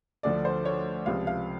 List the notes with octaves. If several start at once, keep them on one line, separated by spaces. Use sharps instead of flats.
D2 D3 F3 D5
C5
C#5
C#2 C3 F3 F5
F5